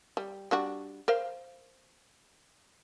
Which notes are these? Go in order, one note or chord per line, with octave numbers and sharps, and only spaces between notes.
G3
G3 D4 F#4
A#4 C5 F5